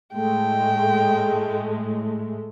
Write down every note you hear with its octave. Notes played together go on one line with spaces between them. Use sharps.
A2 G#3 A3 G5